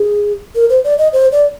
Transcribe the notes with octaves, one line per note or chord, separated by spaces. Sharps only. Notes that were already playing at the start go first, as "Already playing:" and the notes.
Already playing: G#4
A#4
C5
D5
D#5
C5
D5